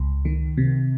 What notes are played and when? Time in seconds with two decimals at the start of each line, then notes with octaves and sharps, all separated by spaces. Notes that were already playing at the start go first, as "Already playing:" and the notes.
Already playing: C#2
0.25 D#3
0.58 C3